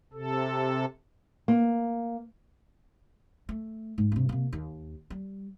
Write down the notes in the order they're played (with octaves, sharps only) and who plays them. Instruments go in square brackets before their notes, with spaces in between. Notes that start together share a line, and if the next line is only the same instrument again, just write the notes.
[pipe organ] C3 A4
[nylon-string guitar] A#3
[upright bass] A3
G#2
G2 C3
C3 A#3
D#2
G3